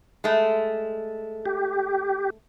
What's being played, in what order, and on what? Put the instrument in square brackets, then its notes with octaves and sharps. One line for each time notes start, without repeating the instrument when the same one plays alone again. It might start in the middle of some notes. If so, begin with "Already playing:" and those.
[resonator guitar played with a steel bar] G#3 A3
[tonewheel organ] G4